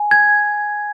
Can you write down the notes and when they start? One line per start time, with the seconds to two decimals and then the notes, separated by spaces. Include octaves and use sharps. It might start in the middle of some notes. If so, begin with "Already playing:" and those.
Already playing: G#5
0.11 G#6